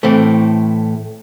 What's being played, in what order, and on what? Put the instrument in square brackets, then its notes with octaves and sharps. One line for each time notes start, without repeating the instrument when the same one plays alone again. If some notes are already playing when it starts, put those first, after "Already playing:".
[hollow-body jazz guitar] A2 E3 A3 C4